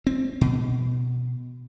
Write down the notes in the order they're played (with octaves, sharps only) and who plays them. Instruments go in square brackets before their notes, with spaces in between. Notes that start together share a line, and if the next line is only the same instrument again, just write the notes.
[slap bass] C4
B2